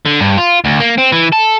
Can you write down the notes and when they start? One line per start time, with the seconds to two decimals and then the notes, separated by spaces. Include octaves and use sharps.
0.06 D3
0.21 G2
0.38 F4
0.65 D2
0.80 A#3
0.98 C4
1.12 E3
1.33 A4